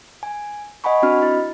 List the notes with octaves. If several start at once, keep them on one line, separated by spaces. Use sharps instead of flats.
G#5
D#5 F#5 G#5 B5 C#6
C4 D4 F#4 D#5 B5 F6
E4